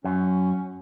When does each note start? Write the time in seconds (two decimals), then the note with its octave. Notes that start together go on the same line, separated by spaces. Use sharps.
0.04 F#2 C#4